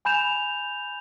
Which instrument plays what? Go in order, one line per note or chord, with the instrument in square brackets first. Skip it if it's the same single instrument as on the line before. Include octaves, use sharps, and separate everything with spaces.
[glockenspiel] G#5 B5 G6 E7 F7